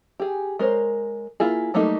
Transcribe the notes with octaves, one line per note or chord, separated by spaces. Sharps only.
G4 G#4
G#3 A#4 C5 C#5
A#3 E4 F4 G#4
F#3 G3 A3 A#3 D#4